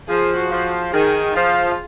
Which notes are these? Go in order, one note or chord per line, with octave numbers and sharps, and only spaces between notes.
F3 G#4
F#4
F3
D#3 G#4
F3 F4